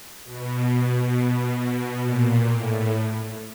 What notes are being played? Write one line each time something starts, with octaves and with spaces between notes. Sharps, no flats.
B2
A#2
A2